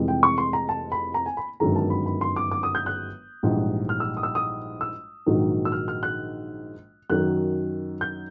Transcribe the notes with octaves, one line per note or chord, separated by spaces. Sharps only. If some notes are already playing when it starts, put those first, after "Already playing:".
Already playing: F1 F2 C3 E3 G#3
G5
C#6
C6
A#5
A5
B5
A#5
G#5
B5
G1 F#2 D#3 G#3 A#5
A5
B5
B5
C6
D6
D6
D#6
G6
F#6
A#1 G#2 E3 G3
F6
E6
D#6
E6
D#6
E6
A#1 G#2 D#3 F#3
E6
F6
F6
F#6
F#2 D#3 F#3 F#6
G6